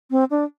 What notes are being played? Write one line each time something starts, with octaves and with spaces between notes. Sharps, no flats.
C4
D4